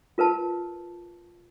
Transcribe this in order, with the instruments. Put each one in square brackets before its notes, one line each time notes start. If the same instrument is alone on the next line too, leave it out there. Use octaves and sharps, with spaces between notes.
[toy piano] F4 A#4 B4 A5